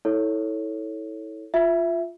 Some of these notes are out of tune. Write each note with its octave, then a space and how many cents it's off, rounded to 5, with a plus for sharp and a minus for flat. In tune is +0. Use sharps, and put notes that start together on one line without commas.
E4 -30 A4 +0 C#5 +0
F4 +0 E5 +10